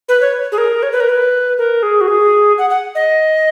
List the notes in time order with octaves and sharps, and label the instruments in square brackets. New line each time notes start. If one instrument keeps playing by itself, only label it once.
[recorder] B4
C#5
G#4
A#4
C#5
B4
A#4
B4
A#4
G#4
F#4
G#4
F#5
F#5
D#5